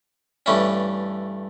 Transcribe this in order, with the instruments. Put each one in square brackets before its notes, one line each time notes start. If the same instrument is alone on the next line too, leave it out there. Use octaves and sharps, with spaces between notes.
[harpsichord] G2 E3 A3 C#4